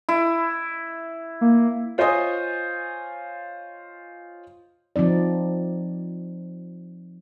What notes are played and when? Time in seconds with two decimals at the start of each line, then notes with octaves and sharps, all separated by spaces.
0.09 E4
1.41 A#3
1.98 F4 C5 C#5 D#5 G#5 D#6
4.96 F3 C4 D#4 D5